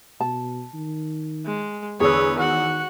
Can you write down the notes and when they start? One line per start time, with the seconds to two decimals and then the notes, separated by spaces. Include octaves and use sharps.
0.20 B2 A5
0.74 D#3
1.45 G#3
2.00 E2 D3 G#4 B4 C#5 E6
2.39 D#3 F#4 F#5